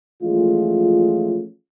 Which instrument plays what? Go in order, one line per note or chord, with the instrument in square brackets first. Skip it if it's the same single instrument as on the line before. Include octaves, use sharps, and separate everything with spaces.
[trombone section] E3 F3 G#3 A3 C#4 F4